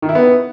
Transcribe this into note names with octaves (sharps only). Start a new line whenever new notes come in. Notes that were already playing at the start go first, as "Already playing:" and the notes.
D#3
E4
B3